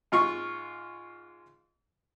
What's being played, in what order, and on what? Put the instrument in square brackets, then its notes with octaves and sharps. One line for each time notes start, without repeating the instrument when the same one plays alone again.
[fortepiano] G#2 F4 C#6